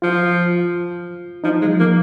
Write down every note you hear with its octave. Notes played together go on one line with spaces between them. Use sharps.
F3 F4
F3 D#4
G#3
F3
A#3